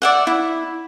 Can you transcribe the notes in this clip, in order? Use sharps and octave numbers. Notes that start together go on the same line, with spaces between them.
D5 E5 F#5
E4